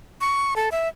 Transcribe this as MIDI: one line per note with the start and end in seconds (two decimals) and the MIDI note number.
0.21 0.54 85
0.56 0.69 69
0.72 0.88 76